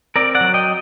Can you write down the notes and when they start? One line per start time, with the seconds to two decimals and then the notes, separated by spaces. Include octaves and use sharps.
0.16 C4 A#4 D5
0.35 D5 F#5
0.41 F#3
0.54 D#5 G5